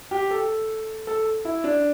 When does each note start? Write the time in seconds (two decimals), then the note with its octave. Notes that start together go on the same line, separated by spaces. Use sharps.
0.11 G4
0.31 A4
1.07 A4
1.45 E4
1.64 D4